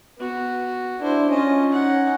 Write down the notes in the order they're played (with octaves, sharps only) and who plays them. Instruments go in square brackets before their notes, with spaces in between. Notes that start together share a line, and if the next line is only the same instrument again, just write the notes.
[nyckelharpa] B3 F#4
[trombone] D4 [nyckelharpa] E4 C5
[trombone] C#4 [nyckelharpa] F4 D#5
[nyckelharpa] D#4 F#5